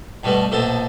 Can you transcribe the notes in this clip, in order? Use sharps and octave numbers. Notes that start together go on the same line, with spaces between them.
G2 B2 A3 B3
A#1 B2 A4 C5 A5